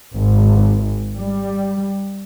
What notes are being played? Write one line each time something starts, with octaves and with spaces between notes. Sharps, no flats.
G#1
G3